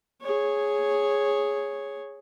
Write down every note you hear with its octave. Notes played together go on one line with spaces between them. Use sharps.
G#4 C#5